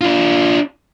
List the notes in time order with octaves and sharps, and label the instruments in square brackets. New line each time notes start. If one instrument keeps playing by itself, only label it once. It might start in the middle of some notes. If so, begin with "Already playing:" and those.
[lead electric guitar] D4 F4